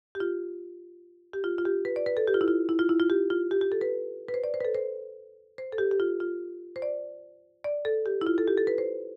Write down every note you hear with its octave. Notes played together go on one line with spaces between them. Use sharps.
G4
F4
G4
F4
F4
G4
B4
D5
B4
A4
G4
F4
E4
F4
E4
F4
E4
F4
G4
F4
G4
G4
A4
B4
B4
C5
D5
C5
B4
A4
C5
C5
A4
G4
G4
F4
F4
C5
D5
D5
A4
G4
E4
F4
A4
G4
A4
B4
C5